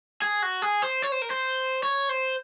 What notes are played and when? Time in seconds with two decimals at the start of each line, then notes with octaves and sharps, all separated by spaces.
0.22 G#4
0.42 F#4
0.62 G#4
0.82 C5
1.02 C#5
1.12 C5
1.22 A#4
1.31 C5
1.83 C#5
2.09 C5